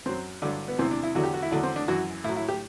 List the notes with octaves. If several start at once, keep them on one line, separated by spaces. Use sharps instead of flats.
F#2 F#3 C4
G2 D3 F#3 D4
B3
E2 C3 E3 C4
D4
E4
E2 D3 F#3 F#4
G4
F#4
E4
E2 D3 F#3 D4
C4
D4
F#2 E3 F#4
A2 E4
F#3
E4
G4